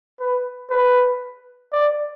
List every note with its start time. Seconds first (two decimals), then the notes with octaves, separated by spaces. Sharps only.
0.20 B4
0.70 B4
1.73 D5